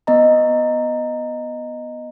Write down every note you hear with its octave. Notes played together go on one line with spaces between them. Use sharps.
B3 D#5 A#5